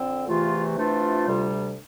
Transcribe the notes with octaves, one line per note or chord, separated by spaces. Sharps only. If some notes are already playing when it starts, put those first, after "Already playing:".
Already playing: F2 D3 C4
E2 C3 E3 A3 F4
C3 E3 A3 D4 F4
D2 C3 G3